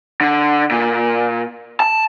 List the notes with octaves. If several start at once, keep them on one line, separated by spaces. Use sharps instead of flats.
D3
A#2
A5